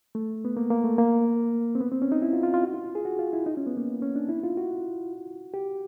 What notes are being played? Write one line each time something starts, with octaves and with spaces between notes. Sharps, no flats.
A3
B3
A#3
A#3
A3
A#3
C4
B3
C4
C#4
D#4
E4
F4
F4
F4
F#4
F4
G#4
F#4
F4
E4
D#4
C#4
B3
A#3
C#4
D4
E4
F4
F#4
G4